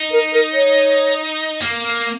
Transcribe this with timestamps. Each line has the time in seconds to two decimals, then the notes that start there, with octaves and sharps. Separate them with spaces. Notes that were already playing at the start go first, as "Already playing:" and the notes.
Already playing: D#4
0.11 A#4
0.32 A#4
0.53 C#5
1.61 A#3